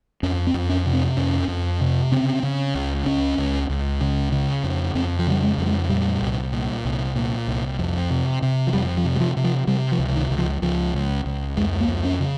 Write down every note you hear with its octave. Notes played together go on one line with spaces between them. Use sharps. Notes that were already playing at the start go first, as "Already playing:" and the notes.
F2 C#4
C4
F2
C#4
C3
C4
F2 C#4
F2
C3
C#3 C4
C#3
C#2
C#2 C#4
C#2
C#2
C#3
C#3
F2
F2 C4
F3
C#3 G3
G#3
F2 G3
G#3
A#2 G3
C2
A#2
C2
A#2
C2
F2
C3
C3
F3
F2 G3
F3
C3
G3
F3
C3
F3
C3 G3
F3
C#2
D#3
C#2
F3
C#2 F3
C#2
C#2
F2 G#3
A#3
F2
C#4
C#3